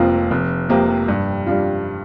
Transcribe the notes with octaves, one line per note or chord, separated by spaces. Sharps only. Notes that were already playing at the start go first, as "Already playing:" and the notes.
Already playing: F1 F2 F3 A#3 F4
F1
F2 C3 F3 A#3
G2
G3 D4 F4